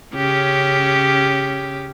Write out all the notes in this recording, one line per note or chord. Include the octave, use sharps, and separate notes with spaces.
C#3 C#4 G4